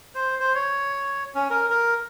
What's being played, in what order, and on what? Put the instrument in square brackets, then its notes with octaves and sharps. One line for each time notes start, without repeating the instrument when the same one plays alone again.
[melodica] C5
C5
C#5
C#4
A#4
A#4